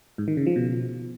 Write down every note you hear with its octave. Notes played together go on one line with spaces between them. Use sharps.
G#2
D#3
C#3
F3
B2